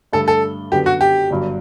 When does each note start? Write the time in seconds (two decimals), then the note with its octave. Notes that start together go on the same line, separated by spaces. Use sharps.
0.13 G2 D3 A3 D4 A4
0.28 A4
0.72 F#2 D3 F#3 B3 G4
0.86 F#4
1.01 G4
1.30 G1 G2 F#3